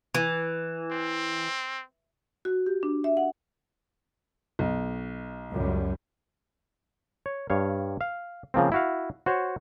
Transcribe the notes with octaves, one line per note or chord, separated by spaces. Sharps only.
E3
C4
F#4
G4
D4
E5
F#5
B1
C#2 F#2 G3
C#5
G2 C#5 F5
F5
C#3 F3 A#3 C4
E4 F#4 F5
F#4 C5 C#5